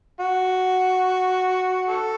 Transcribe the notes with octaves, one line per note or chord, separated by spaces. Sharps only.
F#4
A4